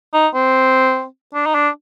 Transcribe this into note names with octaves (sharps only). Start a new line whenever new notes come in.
D#4
C4
D4
D#4
D4